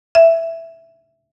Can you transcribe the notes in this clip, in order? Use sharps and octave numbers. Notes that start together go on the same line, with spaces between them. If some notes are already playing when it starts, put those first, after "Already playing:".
E5